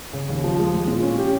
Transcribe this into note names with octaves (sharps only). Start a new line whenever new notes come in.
C#3
D#2
F3
G#3
G#3
A#2
C#4
G4